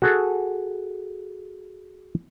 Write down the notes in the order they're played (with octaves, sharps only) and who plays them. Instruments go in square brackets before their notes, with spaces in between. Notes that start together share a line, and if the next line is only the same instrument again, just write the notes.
[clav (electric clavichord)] F#4 G#4 A4